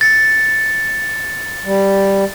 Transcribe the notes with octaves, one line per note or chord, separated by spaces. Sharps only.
A6 C#7
G3